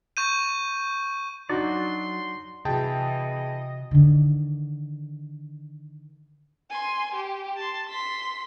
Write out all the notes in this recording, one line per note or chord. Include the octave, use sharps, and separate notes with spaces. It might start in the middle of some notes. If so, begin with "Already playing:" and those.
C#6 G6 D#7
F#3 D4 D#4 F#4 D5 C6
C3 E3 F#4 G#4 D#5 G5 A5
D3 D#3
G#5 C6
G4
A5 C6
C6 B6